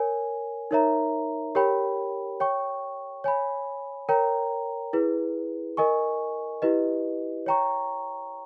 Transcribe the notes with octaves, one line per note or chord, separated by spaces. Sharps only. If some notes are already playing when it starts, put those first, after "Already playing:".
Already playing: A#4 C#5 G#5
D#4 A#4 C#5 E5 A#5
G4 A#4 C#5 G5 B5
C#5 G5 C#6
C#5 G#5 B5
A#4 C#5 G5 A#5
E4 G#4 B4
A#4 D#5 G#5 C#6
E4 G4 B4 D#5
C#5 G5 A#5 C#6